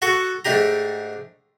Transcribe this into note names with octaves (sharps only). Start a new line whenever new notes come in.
F#4 A4 F#5 C#6
G#2 A3 D4 G4 A#5